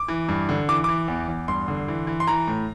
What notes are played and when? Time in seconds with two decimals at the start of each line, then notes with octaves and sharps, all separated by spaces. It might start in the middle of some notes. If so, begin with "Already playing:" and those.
Already playing: D6
0.08 E3
0.29 G2
0.49 D3
0.69 E3 D6
0.84 E3 D6
1.08 E2
1.28 E2
1.48 G2 C6
1.68 D3
1.88 E3
2.07 E3
2.20 C6
2.27 E3 A#5
2.48 A2